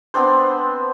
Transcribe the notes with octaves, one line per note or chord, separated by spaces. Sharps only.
B3 C4 D4 C5